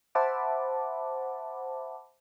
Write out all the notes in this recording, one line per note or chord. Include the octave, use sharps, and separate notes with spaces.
C5 E5 F#5 A5 B5 D6